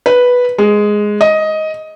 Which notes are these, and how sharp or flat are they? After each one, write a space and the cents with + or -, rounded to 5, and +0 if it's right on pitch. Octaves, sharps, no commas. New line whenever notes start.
B4 -5
G#3 +0
D#5 +10